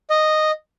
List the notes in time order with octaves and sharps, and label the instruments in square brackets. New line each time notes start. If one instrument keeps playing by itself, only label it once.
[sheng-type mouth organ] D#5